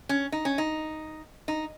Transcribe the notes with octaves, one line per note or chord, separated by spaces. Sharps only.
C#4
D#4
C#4
D#4
D#4